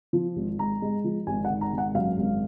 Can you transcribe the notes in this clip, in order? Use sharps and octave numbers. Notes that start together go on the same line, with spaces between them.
F3
G#1
G#2 A#5
G#3
F3
G#1 G#5
F#5
D#3
A#5
G#1
F#5
F#2 F5
G#1